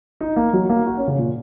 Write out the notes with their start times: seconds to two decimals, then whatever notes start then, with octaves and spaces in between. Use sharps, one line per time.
0.21 D#4
0.36 A#3
0.53 F#3
0.70 A#3
0.86 F#4
0.97 C#4
1.07 C#3
1.18 A#2